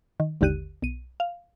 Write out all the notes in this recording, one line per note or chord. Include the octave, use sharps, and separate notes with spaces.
D#3
G#1 D#2 D3 G4 F#6 D#7
B1 D#7
F5